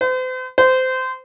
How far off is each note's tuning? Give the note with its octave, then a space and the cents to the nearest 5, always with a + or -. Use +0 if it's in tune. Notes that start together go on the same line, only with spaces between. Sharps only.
C5 -40
C5 -20